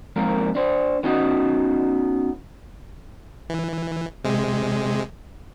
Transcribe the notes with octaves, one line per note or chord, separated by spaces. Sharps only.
F2 G#2 A#3 A#4
D4 C5
B3 C#4 D#4 F#4 D#5
E3
C3 G#3